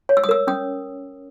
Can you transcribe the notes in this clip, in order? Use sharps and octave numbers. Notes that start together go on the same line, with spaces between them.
C#5
E6
D#6
A#4 E6
C#4 D#6